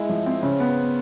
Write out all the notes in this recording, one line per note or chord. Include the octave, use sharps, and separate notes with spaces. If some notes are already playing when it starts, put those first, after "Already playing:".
Already playing: G#3 E4
F3
C4
C#3
B3